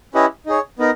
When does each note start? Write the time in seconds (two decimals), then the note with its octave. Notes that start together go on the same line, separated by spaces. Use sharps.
0.14 C#4 E4 G4 B4 D#5
0.46 D#4 G#4 C#5
0.79 B3 D#4 A#4